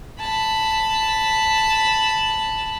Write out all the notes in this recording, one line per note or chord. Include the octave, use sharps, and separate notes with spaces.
A5 B5